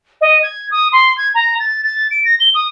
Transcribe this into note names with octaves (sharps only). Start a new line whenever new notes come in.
D#5
G#6
D#6
C6
G#6
A#5
A6
A6
D7
A#6
G7
D#6